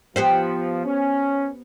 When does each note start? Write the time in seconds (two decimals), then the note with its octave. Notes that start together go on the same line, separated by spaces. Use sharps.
0.16 F3 B3 G4 C5
0.85 C#4